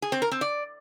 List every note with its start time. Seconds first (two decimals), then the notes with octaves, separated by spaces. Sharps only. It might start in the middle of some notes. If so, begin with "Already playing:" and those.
0.02 G#4
0.12 C4
0.22 A#4
0.31 C4
0.41 D5